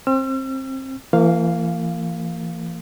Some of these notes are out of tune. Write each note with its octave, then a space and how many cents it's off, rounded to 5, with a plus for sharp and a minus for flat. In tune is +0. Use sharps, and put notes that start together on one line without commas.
C4 +25 E6 +45
E3 +35 A#3 -35 F5 +0